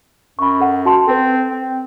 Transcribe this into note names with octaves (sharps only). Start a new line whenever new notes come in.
F#2 B5 C#6
A4 F#5
F#4 A5 C6
C4 A4 B4
C4